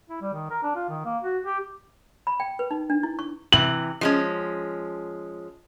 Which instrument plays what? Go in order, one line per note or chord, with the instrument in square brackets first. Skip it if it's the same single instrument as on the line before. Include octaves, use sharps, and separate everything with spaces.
[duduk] E4
G3
D#3
A#4
D4
F4
D#3
A#3
F#4
G4
[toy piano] B5
G5
B4
D#4
D4
E4
C#6
[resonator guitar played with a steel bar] C3 E3 [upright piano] F#7
[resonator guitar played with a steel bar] F3 G#3 C#4